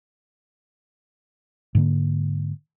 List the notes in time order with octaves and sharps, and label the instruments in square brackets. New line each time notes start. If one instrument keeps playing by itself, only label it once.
[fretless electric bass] G#2 D3 A#3